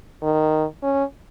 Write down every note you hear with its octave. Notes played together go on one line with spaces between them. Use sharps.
D#3
C#4